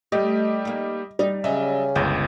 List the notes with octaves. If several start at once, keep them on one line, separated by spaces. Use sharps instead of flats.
G3 A3 G4 D#5
A#3 D#4
G3 D#4
C#3 F#3 C#4 D#5 E5
G1 C#2 D#5 G6